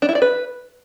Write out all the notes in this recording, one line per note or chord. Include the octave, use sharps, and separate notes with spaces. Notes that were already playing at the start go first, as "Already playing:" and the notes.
D4
E4
D5
B4